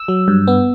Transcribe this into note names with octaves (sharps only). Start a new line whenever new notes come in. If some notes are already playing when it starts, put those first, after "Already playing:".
Already playing: E6
F#3
G2
B3